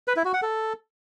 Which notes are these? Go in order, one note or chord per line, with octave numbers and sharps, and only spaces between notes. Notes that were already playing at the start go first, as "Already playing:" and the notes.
B4
E4
F#4
F#5
A4